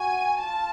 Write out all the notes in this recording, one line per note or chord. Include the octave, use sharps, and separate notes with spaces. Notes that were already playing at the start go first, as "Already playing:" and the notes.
Already playing: F#4 G#5
F4 A5